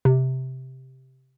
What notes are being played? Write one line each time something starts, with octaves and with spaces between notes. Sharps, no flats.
C3